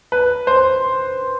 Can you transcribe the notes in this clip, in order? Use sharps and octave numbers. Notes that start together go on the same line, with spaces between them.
B4
C5